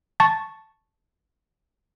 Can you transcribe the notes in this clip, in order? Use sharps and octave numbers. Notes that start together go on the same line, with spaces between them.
A5 C#6 A6